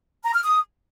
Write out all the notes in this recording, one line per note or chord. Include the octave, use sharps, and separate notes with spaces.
A#5
F6
D#6